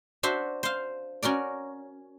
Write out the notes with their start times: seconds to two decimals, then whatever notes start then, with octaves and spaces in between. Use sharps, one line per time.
0.23 D4 F#4 C5 E5
0.63 C5 F5
1.23 C#4 F#4 A#4 D5